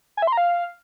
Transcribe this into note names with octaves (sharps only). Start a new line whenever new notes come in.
G#5
E5
C6
A#5
F5